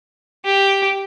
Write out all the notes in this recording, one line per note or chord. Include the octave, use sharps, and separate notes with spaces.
G4